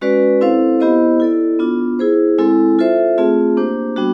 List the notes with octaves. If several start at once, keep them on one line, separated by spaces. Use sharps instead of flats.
G#3 C#4 F#4 B4 D5
C4 E4 A4 C5 F5
B3 E4 G4 C5 D#5
E4 A4 D5
B3 D4 F4
E4 G#4 C5
G#3 C4 E4 A4
F4 A4 C5 E5
A3 C4 F4 G#4
A#3 D4 G4 C5
G3 B3 D4 F#4